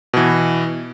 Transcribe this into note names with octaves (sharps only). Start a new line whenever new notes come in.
B2 E3